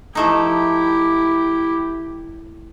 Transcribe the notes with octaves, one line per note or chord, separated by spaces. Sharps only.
F3 A3 D#4 E4 G4